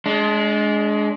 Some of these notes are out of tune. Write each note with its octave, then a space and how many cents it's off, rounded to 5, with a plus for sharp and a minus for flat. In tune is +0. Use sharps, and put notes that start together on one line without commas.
G#3 +15 D4 -25